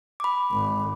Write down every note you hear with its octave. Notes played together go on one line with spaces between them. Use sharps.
B5 D6
G#1